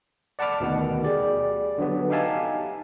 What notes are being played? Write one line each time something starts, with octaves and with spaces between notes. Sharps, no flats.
D5 F#5 A5 B5 D6 F6
D2 B2 D#3 F#5
G4 G#4 D5
D3 F#3 B3
D#4 G4 E5 F5 G#5 A5